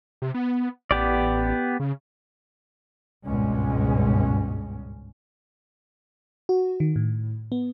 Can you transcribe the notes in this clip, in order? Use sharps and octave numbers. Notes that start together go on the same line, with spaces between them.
C3
B3
A1 B3 G4 D5
C#3
G#1 C#2 G2 B2 G#3 C#4
F#4
D#3
A2
B3